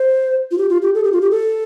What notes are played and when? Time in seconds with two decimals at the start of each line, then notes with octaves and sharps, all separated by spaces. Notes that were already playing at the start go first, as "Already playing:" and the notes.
Already playing: C5
0.51 F4
0.58 G4
0.69 F4
0.82 G4
0.94 A4
1.04 G4
1.12 F4
1.22 G4
1.31 A4